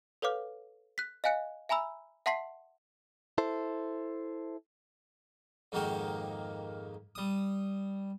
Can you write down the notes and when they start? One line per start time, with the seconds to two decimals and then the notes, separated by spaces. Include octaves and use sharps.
0.22 A4 B4 C#5 F5 D6 F6
0.98 F#6 B6
1.24 D#5 F5 G#5 F#6 C#7
1.69 E5 G#5 A#5 B5 E6
2.26 E5 F#5 A5 C6 B6 C7
3.38 E4 A4 C5
5.72 F2 G#2 D#3 A#3 F#4 G4
7.15 G3 D#6